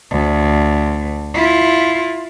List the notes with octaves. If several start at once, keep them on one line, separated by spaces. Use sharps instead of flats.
D2
E4 F4